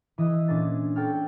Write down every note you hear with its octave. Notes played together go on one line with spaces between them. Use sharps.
E3 D#5 E5
A#2 C#4 D4 A#4 A6
A4 C#5 G5 A5 F6